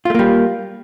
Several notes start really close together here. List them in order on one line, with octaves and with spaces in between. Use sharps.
F4 A3 A#3 G3